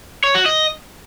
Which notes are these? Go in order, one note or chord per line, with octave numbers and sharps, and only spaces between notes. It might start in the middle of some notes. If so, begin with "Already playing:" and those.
C#5
F#4
D#5